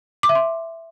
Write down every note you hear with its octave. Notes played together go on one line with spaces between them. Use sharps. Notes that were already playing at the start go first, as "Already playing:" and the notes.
D6
E5
C6